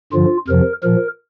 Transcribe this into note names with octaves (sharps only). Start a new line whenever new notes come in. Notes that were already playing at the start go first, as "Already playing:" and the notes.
G2 D3 F3 F4
F2 C3 F3 A#4
A#2 F3 A#4